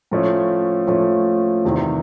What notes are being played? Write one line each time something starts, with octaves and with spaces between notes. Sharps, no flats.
A2 F3 A3 C#4
A2 F3 A3 C#4
E2 C3 D#3